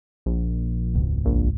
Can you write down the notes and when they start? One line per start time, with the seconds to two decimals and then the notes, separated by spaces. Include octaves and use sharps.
0.26 A#1
0.94 E1 C#2 G#2
1.25 A#1